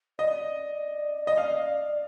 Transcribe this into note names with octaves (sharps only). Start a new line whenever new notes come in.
D5 D#5
D#5
F5